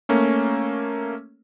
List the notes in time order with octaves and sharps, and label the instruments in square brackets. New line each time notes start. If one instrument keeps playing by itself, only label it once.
[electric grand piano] A3 A#3 C#4